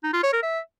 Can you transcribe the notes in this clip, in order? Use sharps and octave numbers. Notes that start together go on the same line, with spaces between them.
D#4
F4
C#5
A#4
E5